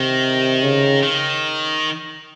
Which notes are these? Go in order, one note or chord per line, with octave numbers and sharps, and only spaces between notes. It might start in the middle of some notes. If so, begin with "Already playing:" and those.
Already playing: C3 D#3
C#3
D#3